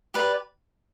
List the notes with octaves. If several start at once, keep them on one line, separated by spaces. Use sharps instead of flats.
G4 B4 D5